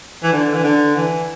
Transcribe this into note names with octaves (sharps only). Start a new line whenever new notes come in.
E3
D3
E3
D3
E3